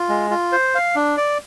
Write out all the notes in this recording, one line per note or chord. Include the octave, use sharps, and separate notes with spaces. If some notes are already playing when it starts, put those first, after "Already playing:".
Already playing: F4
G#3
F4
C5
F5
D4
D5